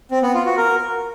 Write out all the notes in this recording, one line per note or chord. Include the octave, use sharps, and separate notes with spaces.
C4
B3
F4
F#4
A#4